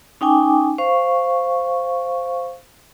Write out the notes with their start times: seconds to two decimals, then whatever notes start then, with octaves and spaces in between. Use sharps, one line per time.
0.21 C#4 D#4 G5 G#5 D6
0.78 C5 F5 C#6